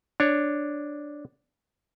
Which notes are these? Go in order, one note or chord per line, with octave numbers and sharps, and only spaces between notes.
D4 C#5